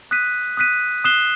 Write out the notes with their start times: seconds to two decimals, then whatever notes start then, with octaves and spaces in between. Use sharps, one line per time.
0.11 D#6 F#6 B6 D#7
0.57 D#6 F#6 B6 D#7
1.04 D#6 F#6 C7 E7 G7